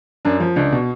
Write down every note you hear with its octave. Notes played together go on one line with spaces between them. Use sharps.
F#2 D4
F3
C#2 D4
B2